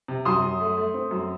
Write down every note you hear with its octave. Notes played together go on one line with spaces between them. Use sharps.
C3
F#2 C6 D#6
F#2
A3
A3
C4
F#2